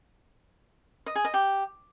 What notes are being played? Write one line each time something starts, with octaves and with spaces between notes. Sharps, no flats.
D#5
G#4
D#5
G4